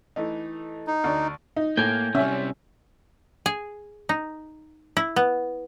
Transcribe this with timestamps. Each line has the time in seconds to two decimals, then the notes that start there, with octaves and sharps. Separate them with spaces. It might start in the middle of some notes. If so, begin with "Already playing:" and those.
0.16 E3 A3 D#4
0.87 D#4
1.04 D2 D4
1.56 D#4
1.77 A2 A#3 G5 G#5
2.15 C3 G3 C#4 E5
3.46 G#4
4.09 D#4
4.97 E4
5.16 B3